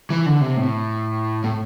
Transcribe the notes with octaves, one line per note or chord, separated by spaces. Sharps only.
E3
D3
C3
A2
A2